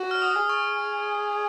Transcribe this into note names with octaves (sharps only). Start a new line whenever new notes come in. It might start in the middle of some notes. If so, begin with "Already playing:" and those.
Already playing: F#4
F6
D#6
G#4
C#6